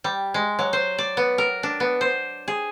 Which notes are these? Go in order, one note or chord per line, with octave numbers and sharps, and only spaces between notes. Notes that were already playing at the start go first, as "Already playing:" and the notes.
G3
G#3
F#3
C5
D5
B3
A#4
D4
B3
C5
G#4